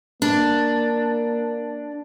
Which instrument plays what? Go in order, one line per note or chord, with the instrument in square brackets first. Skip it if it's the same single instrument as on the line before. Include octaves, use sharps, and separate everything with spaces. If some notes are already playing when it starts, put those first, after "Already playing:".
[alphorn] A#3 [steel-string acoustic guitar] D4